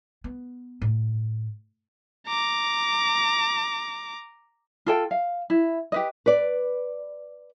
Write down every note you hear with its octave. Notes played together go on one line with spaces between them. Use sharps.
B3
A2
A#5 D6
F4 A4 G5
F5
E4
G4 B4 D#5
B4 D5